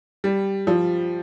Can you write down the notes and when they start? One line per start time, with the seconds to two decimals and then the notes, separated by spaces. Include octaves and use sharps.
0.24 G3
0.67 F3